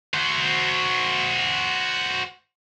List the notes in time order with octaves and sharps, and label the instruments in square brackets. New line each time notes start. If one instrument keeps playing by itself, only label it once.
[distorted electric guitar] F#4 C5